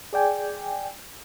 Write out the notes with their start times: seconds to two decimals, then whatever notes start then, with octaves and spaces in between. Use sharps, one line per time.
0.13 G#4 D5 G5 G#5